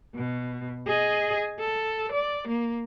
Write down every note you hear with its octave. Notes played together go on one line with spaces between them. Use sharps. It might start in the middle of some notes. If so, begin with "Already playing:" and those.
B2
G#4 D#5
A4
D5
A#3